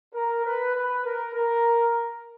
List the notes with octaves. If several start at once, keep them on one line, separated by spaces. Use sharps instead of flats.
A#4
B4
B4
A#4
A#4